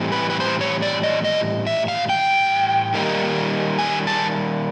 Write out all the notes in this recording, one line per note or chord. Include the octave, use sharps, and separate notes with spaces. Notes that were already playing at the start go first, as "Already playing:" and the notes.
Already playing: A2 E3 G3 C4
B4
B4
C5
C#5
D5
D#5
D#5
E5
F5
G5
D#3 G3 A#3 D#4
G#5
A5